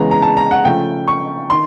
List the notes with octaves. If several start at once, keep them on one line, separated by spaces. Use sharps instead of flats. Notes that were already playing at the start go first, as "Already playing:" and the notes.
Already playing: C#3 E3 G#3 B3 A#5
A#5
A5
A#5
F#5
C#3 F3 A3 G5
C#6
D#3 C6